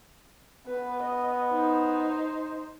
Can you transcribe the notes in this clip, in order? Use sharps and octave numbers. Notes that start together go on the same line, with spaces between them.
B3 B4
D#5
D#4 C5